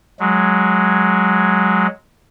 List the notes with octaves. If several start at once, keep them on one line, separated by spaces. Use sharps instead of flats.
F#3 G#3